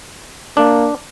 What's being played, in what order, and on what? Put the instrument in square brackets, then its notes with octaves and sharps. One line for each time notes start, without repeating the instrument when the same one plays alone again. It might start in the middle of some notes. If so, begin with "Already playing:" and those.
[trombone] A#3 [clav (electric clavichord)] D4